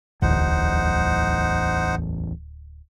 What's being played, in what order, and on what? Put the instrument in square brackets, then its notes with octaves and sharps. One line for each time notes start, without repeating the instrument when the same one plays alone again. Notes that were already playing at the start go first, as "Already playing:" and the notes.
[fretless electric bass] D1 [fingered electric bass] A1 E2 F#3 [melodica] D#4 C5 F#5